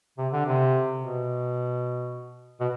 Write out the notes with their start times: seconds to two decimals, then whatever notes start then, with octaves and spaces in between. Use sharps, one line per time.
0.18 C3
0.32 D3
0.46 C3
1.00 B2
2.60 B2